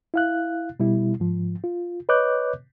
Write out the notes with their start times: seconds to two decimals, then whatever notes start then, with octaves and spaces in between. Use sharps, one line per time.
0.14 E4 F5 F#6
0.80 B2 G3 E4
1.20 G#2 F3
1.64 F4
2.09 B4 C#5 D#5 D6 F#6 G6